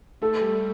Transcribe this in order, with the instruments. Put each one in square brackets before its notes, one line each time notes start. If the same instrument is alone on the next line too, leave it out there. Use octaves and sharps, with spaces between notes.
[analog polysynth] A3 [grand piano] A4
[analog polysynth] G3